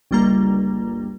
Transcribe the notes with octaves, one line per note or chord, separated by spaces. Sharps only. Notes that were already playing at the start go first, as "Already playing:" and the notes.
G1 C#2 G3 A#3 A#5